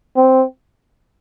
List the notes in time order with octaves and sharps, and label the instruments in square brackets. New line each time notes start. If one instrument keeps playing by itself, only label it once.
[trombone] C4